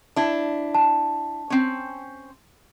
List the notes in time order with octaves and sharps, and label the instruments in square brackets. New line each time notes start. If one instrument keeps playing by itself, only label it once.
[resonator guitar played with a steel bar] D4 E4
[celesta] A5
[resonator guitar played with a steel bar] C4 C#4